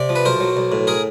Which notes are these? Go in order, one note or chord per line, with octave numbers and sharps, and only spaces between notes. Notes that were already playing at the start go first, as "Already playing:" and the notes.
Already playing: C3 D5
F3
B4
B1 A#4 C5
F#3
B1
A2
G#4 A#4